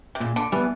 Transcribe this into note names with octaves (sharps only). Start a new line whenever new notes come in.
C3
A#2 C#3
D3
E3 G3 B3